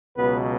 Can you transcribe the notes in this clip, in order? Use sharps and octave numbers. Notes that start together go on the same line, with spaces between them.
C#2 B2 F#3 B3 B4